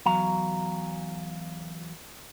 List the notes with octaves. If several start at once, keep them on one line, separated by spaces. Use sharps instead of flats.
E2 F#3 F5 A#5